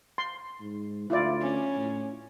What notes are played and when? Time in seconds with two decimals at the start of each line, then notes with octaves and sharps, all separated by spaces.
0.18 C6
0.60 G#2
1.10 D2 E4 F4 D5
1.42 C#4
1.76 A2